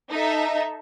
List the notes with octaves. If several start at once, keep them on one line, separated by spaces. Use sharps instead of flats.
D#4 A4 E5